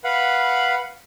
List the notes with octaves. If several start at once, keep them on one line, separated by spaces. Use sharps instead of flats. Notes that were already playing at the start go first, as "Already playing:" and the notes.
B4 F5 F#5 B5